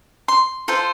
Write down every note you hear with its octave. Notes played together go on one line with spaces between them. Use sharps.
C6
F4 A4 C5